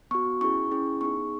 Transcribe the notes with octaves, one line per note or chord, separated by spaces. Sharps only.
B3 F#4 C#6
C#4 E4 G#4 C#6
C#4 E4 G#4
B3 D#4 G#4 C#6